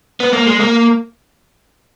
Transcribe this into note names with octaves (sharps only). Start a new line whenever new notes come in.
B3
A#3
G#3
A#3